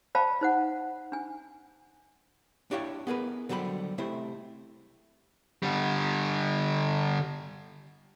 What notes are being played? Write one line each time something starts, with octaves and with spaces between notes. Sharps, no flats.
C5 D5 F5 G5 A5 B5
D#4 C5 F#5
D4 G#5
D4 E4 G4 C#5 F5 G5
B3 G#4 A#4 B4
D3 F#3 G3 C5 B5
C3 A3 E4 C5
D3 G3